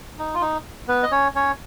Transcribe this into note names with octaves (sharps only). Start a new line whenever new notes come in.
D#4
F4
D#4
B3 B4
D#5
C#4 C#5
C#4 C#5